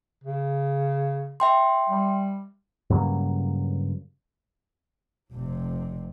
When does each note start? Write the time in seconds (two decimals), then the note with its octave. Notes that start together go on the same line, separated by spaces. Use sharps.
0.24 C#3
1.40 E5 G5 C6
1.89 G3
2.90 G2 C#3 F#3 A#3
5.32 F1 C3